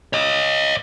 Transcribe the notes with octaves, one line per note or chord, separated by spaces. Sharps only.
C#5 D#5